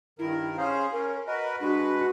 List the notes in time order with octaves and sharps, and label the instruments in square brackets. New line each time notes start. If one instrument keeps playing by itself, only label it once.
[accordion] G2 D#3 A#4 [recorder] E4
[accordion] C#4 G#4 C5 [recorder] F5
[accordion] C#4 [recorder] A#4
[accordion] F#4 A#4 B4 [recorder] D#5
[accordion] G#3 B4 [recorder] D4 [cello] F#4